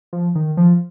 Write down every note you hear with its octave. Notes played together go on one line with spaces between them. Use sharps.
F3
D#3
F3